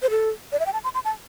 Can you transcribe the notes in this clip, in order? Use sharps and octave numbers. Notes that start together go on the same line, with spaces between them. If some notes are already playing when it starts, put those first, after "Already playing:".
C5
A4
D5
E5
G5
A5
C6
C6
A5